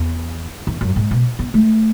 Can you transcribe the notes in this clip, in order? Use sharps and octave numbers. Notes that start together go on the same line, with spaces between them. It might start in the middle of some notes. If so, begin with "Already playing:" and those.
Already playing: E2
E2
F#2
G#2
B2
B3
A3